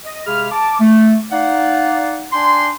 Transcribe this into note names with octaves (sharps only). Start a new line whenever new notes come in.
D#5
C3 G#3 G#4 F5 B5 F6
A5 D6
A3
D#4 D5 F5 F#5
D4 D5 G5 G#5 C6